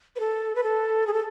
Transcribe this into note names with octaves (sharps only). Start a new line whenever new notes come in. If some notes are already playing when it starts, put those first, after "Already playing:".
B4
A4
B4
A4
G#4
A4